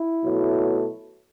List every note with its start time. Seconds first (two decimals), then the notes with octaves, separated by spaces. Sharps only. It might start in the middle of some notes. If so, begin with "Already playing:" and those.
Already playing: E4
0.21 B2 F#3 A3